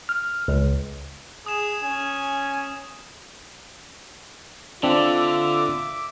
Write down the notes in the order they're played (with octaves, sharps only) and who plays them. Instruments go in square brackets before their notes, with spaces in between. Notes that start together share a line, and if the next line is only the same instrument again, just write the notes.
[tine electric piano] F6
C#2
[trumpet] G#4 [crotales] D#6 E7
[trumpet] C#4 [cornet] G#5
[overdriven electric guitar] D3 [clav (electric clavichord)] C4 D4 [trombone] F4 [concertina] E5 D6